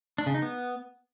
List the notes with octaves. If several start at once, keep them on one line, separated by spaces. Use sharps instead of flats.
D4
C#3
D#4
B3